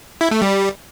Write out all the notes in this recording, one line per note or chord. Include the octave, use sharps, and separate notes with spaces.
E4
A3
G3